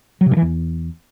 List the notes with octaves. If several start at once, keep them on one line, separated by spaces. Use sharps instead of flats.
F#3
C3
G2
E3
E2